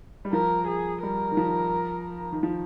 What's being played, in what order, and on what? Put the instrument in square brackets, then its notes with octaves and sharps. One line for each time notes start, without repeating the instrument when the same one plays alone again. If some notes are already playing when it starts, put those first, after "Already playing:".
[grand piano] G3
[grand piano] F3 [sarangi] A#4
[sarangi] G#4
[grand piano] G3 [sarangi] A#4
[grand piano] D#3
F3
D#3
F3